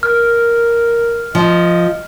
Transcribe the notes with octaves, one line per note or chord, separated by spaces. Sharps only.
A#4 F6
F3 D#5